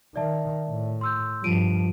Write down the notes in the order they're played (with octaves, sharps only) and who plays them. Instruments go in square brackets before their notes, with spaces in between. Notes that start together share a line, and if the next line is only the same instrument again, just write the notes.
[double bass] D#3 [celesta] D5 E5 A5
[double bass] A2
[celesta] C6 E6 G6
[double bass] G2 F3 [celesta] F4 D7 D#7